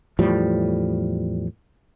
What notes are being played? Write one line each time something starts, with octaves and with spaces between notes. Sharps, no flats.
E2 A2 F3 G3